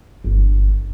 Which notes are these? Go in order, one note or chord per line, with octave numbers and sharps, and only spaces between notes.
G1